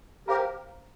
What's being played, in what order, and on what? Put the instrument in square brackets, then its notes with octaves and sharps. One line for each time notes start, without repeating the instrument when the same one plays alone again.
[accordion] G4 A#4 [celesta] C5 F5 A#5